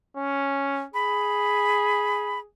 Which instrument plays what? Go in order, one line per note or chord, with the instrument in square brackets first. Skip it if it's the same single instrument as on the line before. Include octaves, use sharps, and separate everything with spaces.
[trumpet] C#4
[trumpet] G#4 [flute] B5